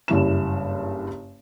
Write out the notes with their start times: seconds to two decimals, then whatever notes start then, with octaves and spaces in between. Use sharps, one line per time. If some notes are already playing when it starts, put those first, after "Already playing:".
0.08 F#1 G2 E4 E7